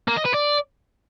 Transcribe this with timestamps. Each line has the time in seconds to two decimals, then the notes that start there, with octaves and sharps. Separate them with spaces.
0.08 A#3
0.16 D#5
0.25 B4
0.34 D5